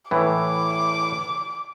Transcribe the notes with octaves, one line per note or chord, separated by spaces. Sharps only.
A2 E3 D6